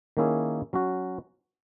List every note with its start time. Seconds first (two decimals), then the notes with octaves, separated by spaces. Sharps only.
0.17 D#3 A#3 C#4 E4 G#4
0.73 F#3 C#4 F#4